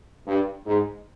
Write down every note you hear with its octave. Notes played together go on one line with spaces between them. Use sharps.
G2
G#2